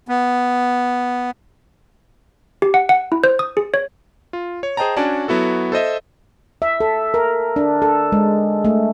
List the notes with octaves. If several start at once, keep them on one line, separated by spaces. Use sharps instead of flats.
B3
G4
F#5
F#5
E4
C5
D#6
G#4
C#5
F4
C#5
G#4 C5 D#5 G5 A5 A#5
C#4 D4 F#4 D5 G#5 A5
F#3 B3 E4 F#4 A4
A4 C5 D#5 E5
E5
A4
A#4
D4
A4
G#3
A3